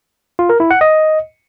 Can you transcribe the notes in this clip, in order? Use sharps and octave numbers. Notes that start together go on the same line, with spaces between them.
F4
A#4
E4
F#5
D#5